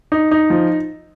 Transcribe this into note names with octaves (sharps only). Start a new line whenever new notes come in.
D#4
D#4
F3